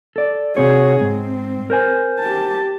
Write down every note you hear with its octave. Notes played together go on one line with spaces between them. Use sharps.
A4 D5
C3 C4 F#4 G#4 C#5
G#2 C4
A#4 C5 G#5
G4 A5